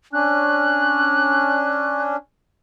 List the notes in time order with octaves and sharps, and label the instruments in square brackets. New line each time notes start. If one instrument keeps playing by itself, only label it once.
[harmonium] C#4 D4 [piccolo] F#6